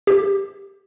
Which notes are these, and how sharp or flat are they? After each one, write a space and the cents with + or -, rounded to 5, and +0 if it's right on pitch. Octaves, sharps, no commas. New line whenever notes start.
G4 +5